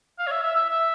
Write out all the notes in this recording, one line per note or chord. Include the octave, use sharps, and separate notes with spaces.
F5
C#5
E5
E5
E5
E5